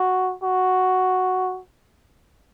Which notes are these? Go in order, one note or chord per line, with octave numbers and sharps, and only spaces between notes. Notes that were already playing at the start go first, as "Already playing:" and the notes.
Already playing: F#4
F#4